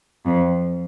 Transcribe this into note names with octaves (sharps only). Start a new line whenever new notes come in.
F2